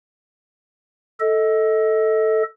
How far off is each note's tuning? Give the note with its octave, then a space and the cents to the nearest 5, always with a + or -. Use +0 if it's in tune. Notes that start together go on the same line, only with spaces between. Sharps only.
A4 +0 D#5 +25